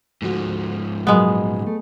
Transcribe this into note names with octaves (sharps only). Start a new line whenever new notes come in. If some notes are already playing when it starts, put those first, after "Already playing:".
D2 G#2 F3 F#4
A#2 C#3 F#3 G#3 B3
A3